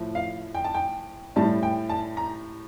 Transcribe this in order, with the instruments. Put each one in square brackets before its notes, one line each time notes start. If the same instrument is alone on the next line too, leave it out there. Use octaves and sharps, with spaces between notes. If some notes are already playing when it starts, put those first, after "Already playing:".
Already playing: [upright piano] A2 F3
F5
G5
A5
G5
A2 G3 A5
G5
A5
A#5